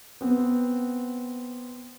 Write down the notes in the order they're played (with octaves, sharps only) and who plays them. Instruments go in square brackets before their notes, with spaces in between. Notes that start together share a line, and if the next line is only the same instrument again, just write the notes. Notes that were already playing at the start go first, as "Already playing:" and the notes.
[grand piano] B3 C4